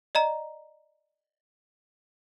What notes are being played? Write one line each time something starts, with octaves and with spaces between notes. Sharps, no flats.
D5 D#5 A#5